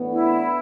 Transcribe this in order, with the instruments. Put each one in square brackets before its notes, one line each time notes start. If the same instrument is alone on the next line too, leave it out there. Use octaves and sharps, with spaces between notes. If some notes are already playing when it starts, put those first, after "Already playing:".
Already playing: [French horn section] A2 E3 B3 D4
[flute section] E4